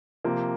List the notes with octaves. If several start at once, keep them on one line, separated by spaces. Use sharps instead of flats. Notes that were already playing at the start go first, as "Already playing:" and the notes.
C3 F3 A#3